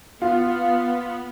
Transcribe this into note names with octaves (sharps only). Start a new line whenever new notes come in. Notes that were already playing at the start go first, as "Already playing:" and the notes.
B3 F4